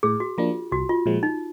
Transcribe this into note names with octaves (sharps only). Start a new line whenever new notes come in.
A2 G#4
F#4
F3 A#3 D4 F4
C2 F#4
F4
A#2 F3 G#3
D#4